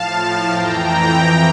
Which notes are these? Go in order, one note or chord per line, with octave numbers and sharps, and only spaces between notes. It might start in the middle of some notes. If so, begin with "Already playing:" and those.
Already playing: A2 F3 F5 A5
F2 E3 G5 A#5